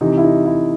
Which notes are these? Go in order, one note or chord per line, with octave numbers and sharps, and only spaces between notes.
C3 E3 D#4
E4
D#4
E4